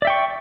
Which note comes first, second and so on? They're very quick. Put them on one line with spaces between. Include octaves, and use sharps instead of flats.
D5 E5 G5 C#6